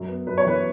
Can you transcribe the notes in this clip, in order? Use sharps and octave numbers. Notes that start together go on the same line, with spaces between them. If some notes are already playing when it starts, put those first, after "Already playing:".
Already playing: F#2
B3
F#2 B4
C#5
E3 B4